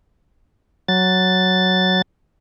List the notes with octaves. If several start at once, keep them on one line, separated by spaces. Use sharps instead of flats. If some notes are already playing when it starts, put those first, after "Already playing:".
F#3 A6